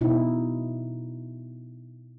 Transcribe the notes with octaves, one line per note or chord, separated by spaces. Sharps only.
B2 D#4 E4